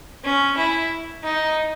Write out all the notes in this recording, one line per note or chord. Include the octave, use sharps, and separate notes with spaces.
C#4
E4
D#4